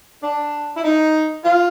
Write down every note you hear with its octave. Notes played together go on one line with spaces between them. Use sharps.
D4
E4
D#4
F4